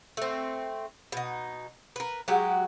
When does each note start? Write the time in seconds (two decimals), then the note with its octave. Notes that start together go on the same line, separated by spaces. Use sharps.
0.17 A3 C4
1.12 B2 D#4
1.96 A#4 B4
2.28 F#3 G#3 F#4 G4